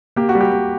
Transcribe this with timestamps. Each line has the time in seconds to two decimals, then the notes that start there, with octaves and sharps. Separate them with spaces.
0.16 A#3 G4
0.29 F#4
0.35 G3
0.41 G4
0.52 G3